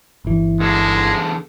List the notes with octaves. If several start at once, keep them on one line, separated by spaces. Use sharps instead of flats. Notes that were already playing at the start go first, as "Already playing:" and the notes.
G1 E3
E2 D3 G#3 A4